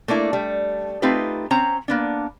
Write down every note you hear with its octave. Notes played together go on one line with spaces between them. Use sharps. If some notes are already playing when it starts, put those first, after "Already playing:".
A3 A#3 D4 E4
G3 A3
A3 C4 D#4 F4 G4 B4
C4 C#4 C5 A#5
A#3 B3 D4